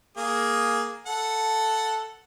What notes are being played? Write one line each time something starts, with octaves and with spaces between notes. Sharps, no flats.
A#3 G#4
A4 F#5